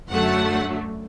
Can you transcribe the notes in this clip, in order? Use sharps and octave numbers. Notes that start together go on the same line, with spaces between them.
F#2 D3 F#3 A3 F#5